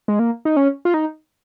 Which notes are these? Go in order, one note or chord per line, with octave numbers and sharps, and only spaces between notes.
G#3
A#3
D#4
C#4
F4
D#4